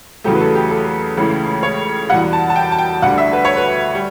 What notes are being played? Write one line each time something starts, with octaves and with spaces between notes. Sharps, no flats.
E2 C#3 F#3 A3 G4
B4
A4
G4
A4
C#2 C#3 E3 A3
C#5
E2 B2 G3 F#5
A5
A5
G5
A5
G5
D2 D3 G3 F#5
E5
B4
C#5
B4
G3